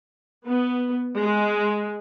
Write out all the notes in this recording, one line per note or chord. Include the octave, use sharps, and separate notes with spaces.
B3
G#3